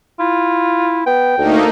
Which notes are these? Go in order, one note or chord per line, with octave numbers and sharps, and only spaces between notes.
E4 F4
B3 G5
D2 A3 A#3 D#4